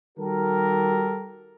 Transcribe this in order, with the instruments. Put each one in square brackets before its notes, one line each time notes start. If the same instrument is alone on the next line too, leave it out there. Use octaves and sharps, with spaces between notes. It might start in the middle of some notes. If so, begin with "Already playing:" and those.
[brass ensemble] D#3 G3 F#4 G4 A4 A#4